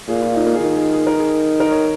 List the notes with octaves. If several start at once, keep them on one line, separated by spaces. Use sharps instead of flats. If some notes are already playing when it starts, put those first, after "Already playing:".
A#2 G#4
F4
D#4
A#3
G#4
D#3 F4
G#4
G#4
A#4
G#4
A#4
C#5